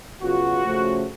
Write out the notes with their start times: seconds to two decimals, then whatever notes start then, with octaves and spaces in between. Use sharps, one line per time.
0.21 C#3 F#3 B3 F4 F#4
0.63 C#3 F3 A3 C#4